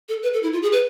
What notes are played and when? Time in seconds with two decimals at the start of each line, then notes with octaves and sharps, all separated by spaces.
0.09 A4
0.23 B4
0.34 A4
0.43 E4
0.53 F4
0.62 G#4
0.72 B4